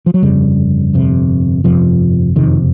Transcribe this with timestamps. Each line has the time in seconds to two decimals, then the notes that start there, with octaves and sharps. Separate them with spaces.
0.06 F3
0.14 F#3
0.22 G1 F2 C#3 G3
0.93 G1 F2 C3
1.64 G1 F2 C3 F3
2.36 F#1 F2 C3 D#3